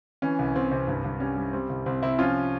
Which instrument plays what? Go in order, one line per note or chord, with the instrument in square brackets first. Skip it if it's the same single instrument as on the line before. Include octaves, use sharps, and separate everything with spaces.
[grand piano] E3 C#4
C2
C2 C4
C3
G2
G2
G3 C#4
G3
G3 C4
C2
C2 C4
C3 C4 E4
F3 C#4 F4